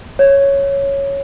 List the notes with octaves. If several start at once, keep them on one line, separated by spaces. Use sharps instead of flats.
C#5